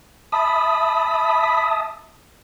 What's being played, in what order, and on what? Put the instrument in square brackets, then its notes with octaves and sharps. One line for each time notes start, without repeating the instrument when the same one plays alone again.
[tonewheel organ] E5 A5 D#6 [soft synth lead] B5